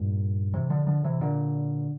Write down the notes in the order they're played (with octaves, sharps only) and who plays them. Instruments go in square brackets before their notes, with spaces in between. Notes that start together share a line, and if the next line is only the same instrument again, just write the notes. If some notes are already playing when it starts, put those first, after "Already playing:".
Already playing: [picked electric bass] G2 A#2
C3 E3
D3 F3
D3 F3
C3 E3
A#2 D3